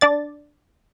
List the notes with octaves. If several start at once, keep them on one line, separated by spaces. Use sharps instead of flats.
D4 D5 A6